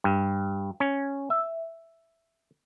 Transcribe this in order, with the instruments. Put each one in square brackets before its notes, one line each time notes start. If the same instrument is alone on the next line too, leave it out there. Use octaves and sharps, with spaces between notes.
[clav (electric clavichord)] G2
C#4
E5